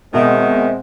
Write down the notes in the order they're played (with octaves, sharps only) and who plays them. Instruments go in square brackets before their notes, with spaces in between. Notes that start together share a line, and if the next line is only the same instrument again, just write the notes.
[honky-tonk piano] B2 [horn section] D#3 [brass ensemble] G#3 C4 [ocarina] E5